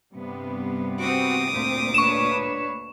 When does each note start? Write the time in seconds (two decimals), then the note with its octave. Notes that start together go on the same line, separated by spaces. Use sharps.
0.12 G2 C3 B3
0.99 C4 F#4 D6 D#6
1.52 D2 A#2 C4 C5
1.94 D4 B4 C#5 C#6 E7